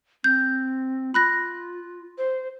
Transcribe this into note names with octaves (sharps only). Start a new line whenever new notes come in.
C4 G6
F4 B5 F#6 A#6
C5